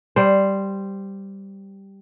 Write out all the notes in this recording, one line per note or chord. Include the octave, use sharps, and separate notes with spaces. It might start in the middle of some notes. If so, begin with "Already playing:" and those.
G3 C5